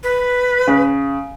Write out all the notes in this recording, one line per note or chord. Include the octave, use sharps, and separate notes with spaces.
B4
C#3